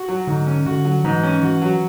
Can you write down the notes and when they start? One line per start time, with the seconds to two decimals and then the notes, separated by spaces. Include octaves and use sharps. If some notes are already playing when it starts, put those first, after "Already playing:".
Already playing: F#4
0.09 F#3
0.27 G#2 D3
0.47 C#4
0.66 D3 F#4
0.85 F#3
1.04 G#2 E3
1.23 C#4
1.42 E3 F#4
1.62 F#3